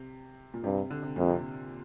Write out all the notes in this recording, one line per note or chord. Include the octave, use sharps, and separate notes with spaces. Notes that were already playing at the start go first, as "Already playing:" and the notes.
Already playing: C3
A#2
G2 C3
D3
C3
F2 A#2
C3